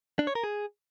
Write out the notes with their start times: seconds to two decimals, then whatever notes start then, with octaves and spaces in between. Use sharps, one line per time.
0.19 D4
0.27 C#5
0.35 A#4
0.44 G#4